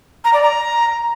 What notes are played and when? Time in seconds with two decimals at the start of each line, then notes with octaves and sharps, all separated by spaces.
0.25 A#5
0.34 D5
0.43 A#5